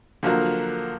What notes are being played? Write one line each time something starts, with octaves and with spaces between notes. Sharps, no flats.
D3 F3 F#3 A#3